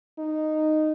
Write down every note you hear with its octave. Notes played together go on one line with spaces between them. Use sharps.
D#4